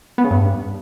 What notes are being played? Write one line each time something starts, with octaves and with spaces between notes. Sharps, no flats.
B3
C#3
G2